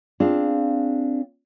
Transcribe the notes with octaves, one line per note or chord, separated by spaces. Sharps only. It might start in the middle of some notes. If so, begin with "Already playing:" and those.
C4 D4 F4 G#4 F5